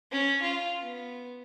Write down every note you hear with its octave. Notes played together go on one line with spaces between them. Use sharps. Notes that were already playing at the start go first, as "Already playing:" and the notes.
C#4
F4
B3